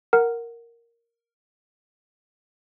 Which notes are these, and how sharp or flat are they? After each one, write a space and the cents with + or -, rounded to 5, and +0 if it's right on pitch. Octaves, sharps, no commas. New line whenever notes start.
A#4 +0 F#5 +0